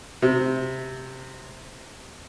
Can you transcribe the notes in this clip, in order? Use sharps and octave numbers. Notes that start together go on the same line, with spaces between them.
C3